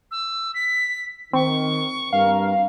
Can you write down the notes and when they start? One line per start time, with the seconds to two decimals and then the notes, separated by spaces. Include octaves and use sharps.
0.11 E6
0.54 B6
1.33 D#3 C4 C#6
2.13 G2 A#4 F5